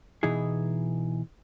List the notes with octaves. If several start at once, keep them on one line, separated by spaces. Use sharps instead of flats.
B2 E3 D#4 E4 G#4